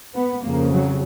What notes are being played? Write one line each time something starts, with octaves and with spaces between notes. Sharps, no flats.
B3
F2 C#3 A#3
F#3